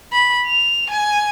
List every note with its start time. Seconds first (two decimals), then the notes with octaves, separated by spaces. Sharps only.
0.13 B5
0.47 F7
0.90 G#5